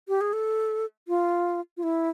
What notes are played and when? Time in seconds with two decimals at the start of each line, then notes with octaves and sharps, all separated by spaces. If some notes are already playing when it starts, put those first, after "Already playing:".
0.08 G4
0.21 G#4
0.33 A4
1.08 F4
1.77 F4
1.83 E4